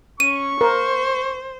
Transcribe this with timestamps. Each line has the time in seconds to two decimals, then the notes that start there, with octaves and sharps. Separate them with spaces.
0.20 C#4 C#6 D#7
0.61 A#4 C5